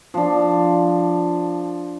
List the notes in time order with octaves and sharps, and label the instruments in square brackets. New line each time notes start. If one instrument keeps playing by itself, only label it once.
[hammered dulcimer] F3 D4